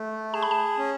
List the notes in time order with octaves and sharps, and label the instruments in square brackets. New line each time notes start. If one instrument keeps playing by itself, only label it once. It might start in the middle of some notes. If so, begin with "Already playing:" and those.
Already playing: [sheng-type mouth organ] A3
[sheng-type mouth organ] G#4 [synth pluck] A5
[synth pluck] B5
A5
[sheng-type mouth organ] C#4